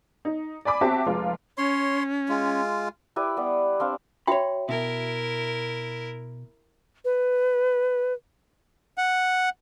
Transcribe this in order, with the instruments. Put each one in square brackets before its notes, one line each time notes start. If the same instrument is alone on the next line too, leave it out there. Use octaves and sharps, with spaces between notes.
[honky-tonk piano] D#4
D5 G#5 B5 D6
C4 F#4 G4 E5 A5
F1 G#3 F4
[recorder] C#4 [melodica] C#5 C6
[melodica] G#3 F4
[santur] E4 G4 B4 D5
G3 B3 D5
C4 D4 F5
[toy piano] F#4 E5 G5 [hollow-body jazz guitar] C#5 B5
[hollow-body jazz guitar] B2 [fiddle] E4 A#4 [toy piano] E5
[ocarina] B4
[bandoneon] F#5